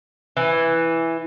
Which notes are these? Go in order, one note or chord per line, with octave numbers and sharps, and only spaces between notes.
E3